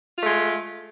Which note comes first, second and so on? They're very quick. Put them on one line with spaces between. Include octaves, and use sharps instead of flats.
F4 A3 G#3